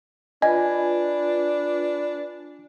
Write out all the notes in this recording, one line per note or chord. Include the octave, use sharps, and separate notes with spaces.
D4 F4 B4 D#5 G#5 B5